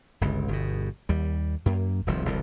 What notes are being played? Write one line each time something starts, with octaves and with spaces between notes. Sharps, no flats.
G1 C#2
G1 B2
D#2 G3
F#2 A#3
D#1 C2 F3
E1 C2 D3